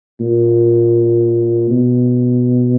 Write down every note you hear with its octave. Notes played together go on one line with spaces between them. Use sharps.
A#2
B2